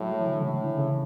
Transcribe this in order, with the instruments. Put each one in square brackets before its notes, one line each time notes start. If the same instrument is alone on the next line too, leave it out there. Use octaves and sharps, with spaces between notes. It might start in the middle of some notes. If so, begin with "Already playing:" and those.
Already playing: [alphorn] A2 [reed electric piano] F#3
[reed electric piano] G#3
E3
D3
[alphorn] A2 [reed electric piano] C#3
[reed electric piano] D3
E3
C#3